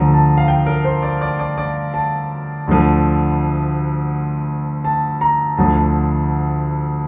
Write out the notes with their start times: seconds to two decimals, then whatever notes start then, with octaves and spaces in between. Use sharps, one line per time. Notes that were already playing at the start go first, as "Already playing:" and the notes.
Already playing: D2 D3 F3 A#5
0.12 A5
0.38 F5
0.48 G5
0.66 A#4
0.84 C5
1.02 D5
1.21 D5
1.39 D5
1.58 D5
1.94 A5
2.67 D2 D3 F3
4.85 A5
5.21 A#5
5.57 D2 D3 F3 A5